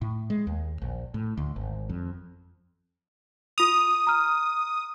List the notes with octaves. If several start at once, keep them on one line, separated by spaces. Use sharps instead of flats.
A2
G#3
D#2
A#1
A2
D2
G#1
F2
F4 D#6 F7
A#5 F6